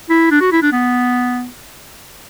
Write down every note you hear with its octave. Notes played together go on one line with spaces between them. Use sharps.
E4
D4
F#4
E4
D4
B3